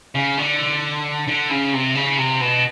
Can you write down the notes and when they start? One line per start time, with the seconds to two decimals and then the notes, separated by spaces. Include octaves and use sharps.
0.15 C#3
0.37 D3
1.28 D3
1.50 C#3
1.73 C3
1.95 C#3
2.18 C3
2.41 B2